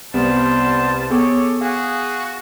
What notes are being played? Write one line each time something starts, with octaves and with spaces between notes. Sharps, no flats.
C2 G3 B3 C5 A5
B3 G#4 A4 C#5 D6
F#4 G#4 F5